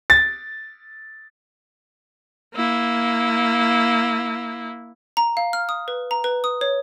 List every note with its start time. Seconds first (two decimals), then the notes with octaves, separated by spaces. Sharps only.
0.10 A6
2.55 A#3 E4
5.17 A#5
5.37 F5
5.53 F6
5.69 D#6
5.88 B4
6.11 A#5
6.24 B4
6.44 D#6
6.61 C#5